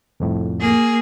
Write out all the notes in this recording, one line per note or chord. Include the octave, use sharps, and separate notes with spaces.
C2 F2 A2
A#3 G#4